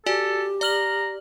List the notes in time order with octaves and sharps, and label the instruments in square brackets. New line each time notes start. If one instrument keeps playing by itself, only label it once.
[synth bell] F#4 D5 G#5 [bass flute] G4 [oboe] A4
[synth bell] D5 F6 F#7 [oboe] A#5